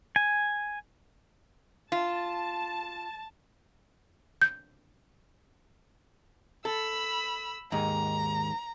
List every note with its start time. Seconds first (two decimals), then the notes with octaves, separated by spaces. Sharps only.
0.16 G#5
1.92 F4 A5
4.42 G6
6.65 A4 B5 E6
7.72 D#2 G#2 D#4 A#5